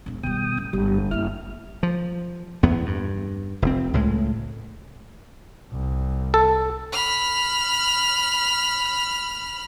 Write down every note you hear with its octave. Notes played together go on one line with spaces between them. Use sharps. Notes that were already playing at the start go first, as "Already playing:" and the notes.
E1 A#1
B2 D#3 G3 G5 D#6
A1
G1 G2 G3
F#1 A#3 E4 F6
F3
E2 B3
G2
F1 C4
C#2 A2 G#3
C2
A4
B5 F6